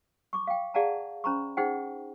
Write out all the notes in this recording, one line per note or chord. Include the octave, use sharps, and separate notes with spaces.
C#6 D6
F5 G5
G#4 D5 F5 F#5 A5 A#5
C#4 C5 A#5 B5 C#6
D#4 G#4 C5 F#5 G5